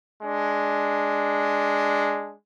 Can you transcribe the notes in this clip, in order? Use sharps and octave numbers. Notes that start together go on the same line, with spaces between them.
G#3 D4